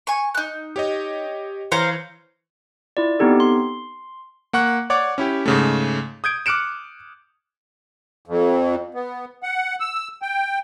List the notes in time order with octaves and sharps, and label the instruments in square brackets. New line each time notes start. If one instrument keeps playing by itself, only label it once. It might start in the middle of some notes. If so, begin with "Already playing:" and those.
[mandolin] G#5 C#6
D#4 F#6
[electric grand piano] G4 C#5 D#5
[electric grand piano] E3 C#5 C#7 [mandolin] C5 F5 A#5
[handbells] E4 F4 D5
B3 C4 D#4 G4 A4
C6
[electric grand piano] A#3 F#5 C#6 F#6
C#5 D5 F#5 D6
C#4 E4 G4
G#2 C#3 A3
D#6 G6 G#6 D7
D6 F6 F#6 C#7 D7 E7
[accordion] F2
B3
F#5
E6
G5